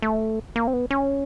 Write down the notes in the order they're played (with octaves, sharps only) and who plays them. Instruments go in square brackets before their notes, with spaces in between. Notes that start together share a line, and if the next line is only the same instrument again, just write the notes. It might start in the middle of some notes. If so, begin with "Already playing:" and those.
[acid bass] A3
A#3
C4
B3
C#4